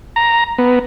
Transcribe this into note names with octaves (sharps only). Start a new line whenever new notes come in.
A#5
B3